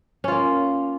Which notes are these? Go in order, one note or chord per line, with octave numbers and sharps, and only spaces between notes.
A#3 C#4 F4